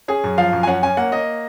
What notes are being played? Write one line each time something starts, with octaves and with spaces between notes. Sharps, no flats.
C#4 G#4
F#2
F3 F5
F#2
G#5
C#4 F#5
C#4 G#5
A#3 F#5
A#3 D#5